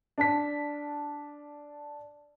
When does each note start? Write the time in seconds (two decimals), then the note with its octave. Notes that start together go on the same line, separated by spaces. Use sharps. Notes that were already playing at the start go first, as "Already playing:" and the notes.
0.18 D4 A5 B6